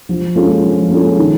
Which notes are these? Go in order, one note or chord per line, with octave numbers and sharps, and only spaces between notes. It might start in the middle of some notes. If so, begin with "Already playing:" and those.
F3
G#3 C#4 F4 A4
F3
G#3 C#4 F4 A4
D#3